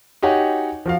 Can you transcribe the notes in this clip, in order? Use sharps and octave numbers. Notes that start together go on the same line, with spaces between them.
D#4 F#4 G4 C#5 F#5 G#5
F3 F#4 F5